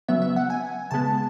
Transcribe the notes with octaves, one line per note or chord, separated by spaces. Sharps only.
C#3 F#3 B3 E5
E5
F#5
G#5
C#3 G#3 B3 A5